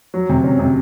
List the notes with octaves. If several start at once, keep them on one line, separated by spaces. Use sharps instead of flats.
F#3
C3
C#4
C3